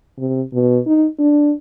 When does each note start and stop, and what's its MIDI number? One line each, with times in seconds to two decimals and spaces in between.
0.18 0.42 48
0.54 0.78 47
0.87 1.07 63
1.19 1.52 62